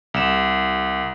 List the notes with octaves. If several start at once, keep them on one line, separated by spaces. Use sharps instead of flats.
C2 E7